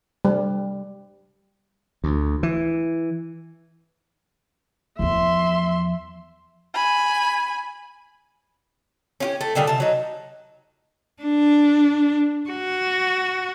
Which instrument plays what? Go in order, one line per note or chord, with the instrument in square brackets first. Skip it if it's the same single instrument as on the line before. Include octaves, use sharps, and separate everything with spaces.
[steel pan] G3
[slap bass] D2
E3
[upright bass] E2 F3 [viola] E5 C6
[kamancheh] G#5 B5
[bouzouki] C#4 F4 G4
A3
A#2 D3 G3 G#4
C3 A5
F#3 D#4
[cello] D4
F#4